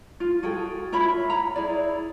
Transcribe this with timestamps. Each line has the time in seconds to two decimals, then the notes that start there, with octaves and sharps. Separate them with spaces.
0.20 F4
0.43 F#4 G#4 A4 G5
0.92 F4 C#5 E5 B5
1.30 A#5 B5
1.56 E4 G#4 D5